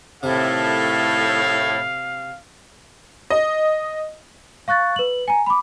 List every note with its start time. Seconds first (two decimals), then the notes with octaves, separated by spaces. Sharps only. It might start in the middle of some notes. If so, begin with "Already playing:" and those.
0.23 A2 C3 D#3 A4 E5 F5
3.30 D#5
4.68 F5 C#6 F#6 A6
4.96 B4 F#7
5.28 G#5 A#5
5.46 B5 D6